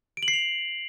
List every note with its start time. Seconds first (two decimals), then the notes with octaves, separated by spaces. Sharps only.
0.17 D7
0.23 F#7
0.28 C7
0.33 F7